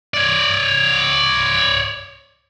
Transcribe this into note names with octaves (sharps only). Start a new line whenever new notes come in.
C#5 D5